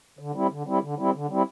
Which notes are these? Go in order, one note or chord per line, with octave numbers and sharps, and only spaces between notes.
D3
G3 C4 E4
D3
G3 C4 E4
D3
G3 C4 E4
D3
G3 C4 E4